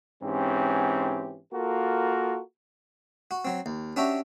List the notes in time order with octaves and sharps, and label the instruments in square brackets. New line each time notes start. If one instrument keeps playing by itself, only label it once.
[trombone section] G#2 E3 C4 C#4 G4
A#3 F4 F#4 A4 A#4
[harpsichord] F#4
F#3 C4
D#2
C#4 D4 F#4 G4 E5 A#5